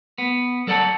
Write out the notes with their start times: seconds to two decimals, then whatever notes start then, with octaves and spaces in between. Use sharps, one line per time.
0.18 B3
0.67 F#3 A4 D5 F#5 A5